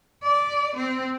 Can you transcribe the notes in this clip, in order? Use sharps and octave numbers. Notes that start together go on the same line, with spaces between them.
D5
C4